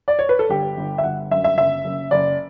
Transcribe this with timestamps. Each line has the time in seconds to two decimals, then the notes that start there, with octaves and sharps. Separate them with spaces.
0.08 D5
0.19 C#5
0.29 B4
0.39 A4
0.50 G1 G4
0.77 G1
0.98 E5
1.04 G1 F#5
1.31 F#2 E5
1.44 E5
1.58 F#1 E5
1.85 F#1
2.11 F#1 D5